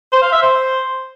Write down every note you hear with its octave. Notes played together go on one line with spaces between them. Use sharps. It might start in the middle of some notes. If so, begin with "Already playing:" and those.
C5
F5
E5
C5